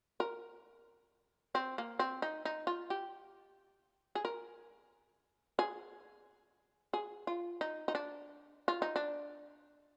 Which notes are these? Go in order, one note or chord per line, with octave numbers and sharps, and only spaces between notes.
A#4
C4
A#3
C4
D#4
D#4
F4
G4
G#4
A#4
G#4
G#4
F4
D#4
D#4
D4
F4
D#4
D4